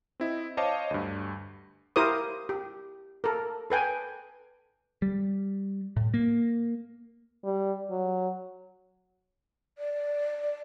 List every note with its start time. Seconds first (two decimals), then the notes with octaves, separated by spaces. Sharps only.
0.20 C4 E4 D#5
0.57 C5 C#5 D#5 F5 A5 D6
0.91 D2 G2
1.96 E4 G4 A#4 C5 D6 D#6
2.49 G4
3.24 A4 A#4
3.70 A4 B4 G5 G#5
5.02 G3
5.97 A2
6.14 A#3
7.44 G3
7.90 F#3
9.78 D5